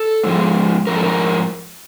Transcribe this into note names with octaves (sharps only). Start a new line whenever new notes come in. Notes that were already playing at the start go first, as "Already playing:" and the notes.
Already playing: A4
G#2 F3 G#3
G#2 F3 A#4
A4
A#4